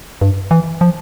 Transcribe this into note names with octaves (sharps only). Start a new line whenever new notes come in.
G2
E3
F3